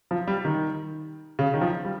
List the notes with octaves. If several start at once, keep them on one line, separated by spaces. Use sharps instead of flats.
F3
G3
D#3
C#3
D#3
F3
G3